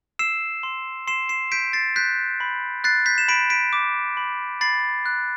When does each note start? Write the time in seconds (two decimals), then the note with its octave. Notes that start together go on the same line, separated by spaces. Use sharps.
0.19 E6 C7 E7
0.63 C6
1.07 C6 C7 E7
1.29 C7 E7
1.52 G6 B6 D7
1.73 A6 C7
1.96 F#6 G6 B6
2.40 B5
2.84 F#6 A6 C7
3.06 G6 B6
3.18 E7
3.28 B5 B6 D7
3.50 B6 D7
3.73 D6
4.17 B5
4.61 B5 A6 C7
5.06 F#6